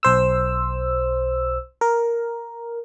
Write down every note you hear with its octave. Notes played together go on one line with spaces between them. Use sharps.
B1 C5 E6
A#4